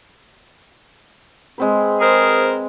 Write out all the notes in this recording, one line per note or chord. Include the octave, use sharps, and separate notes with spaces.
G#3 C4 B4
G#4 A#4 C5